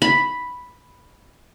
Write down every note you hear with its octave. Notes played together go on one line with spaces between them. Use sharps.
B5